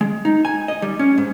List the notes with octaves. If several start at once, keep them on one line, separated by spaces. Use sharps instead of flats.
G#3
D#4
G#5
D#5
G3
C#4
G#2